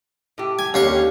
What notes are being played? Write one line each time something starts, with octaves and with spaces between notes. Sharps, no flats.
A2 G4
G#5
D#2 D3 C#4 G4 F5 C#6